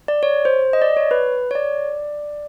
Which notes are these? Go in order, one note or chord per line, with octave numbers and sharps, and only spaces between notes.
D5
C#5
C5
D#5
D5
C#5
B4
C#5
D5